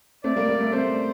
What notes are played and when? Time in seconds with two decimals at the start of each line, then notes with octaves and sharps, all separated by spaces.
0.24 A3 C4 D5
0.36 G3 A#3
0.49 G3
0.61 A3
0.72 A3 C4 C5